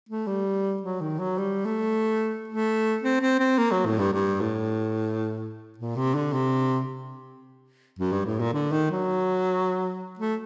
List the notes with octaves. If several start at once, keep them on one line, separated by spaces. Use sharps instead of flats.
A3
G3
F#3
D#3
F#3
G3
A3
A3
C4
C4
C4
A#3
F#3
A2
G2
G2
A2
A#2
C3
D3
C3
F#2
G2
A2
A#2
D3
D#3
F#3
A3